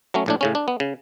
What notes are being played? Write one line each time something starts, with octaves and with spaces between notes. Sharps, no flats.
F#3 A3 C#4
A#1 A2 D4
A2 C#3 C#4
D4
B3
C#3